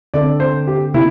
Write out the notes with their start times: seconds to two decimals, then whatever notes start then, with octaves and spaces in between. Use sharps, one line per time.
0.14 D3 C4 A4 D5
0.40 C5
0.67 G4
0.94 C3 E4